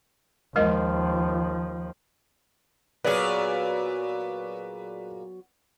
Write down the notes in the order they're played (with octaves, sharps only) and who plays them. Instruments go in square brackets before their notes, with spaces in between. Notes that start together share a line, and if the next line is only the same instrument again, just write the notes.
[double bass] D#2 F3 [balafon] G#3 A#4 D#5
[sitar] A#2 G#4 [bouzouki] F#3 B3 [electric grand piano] B4 D5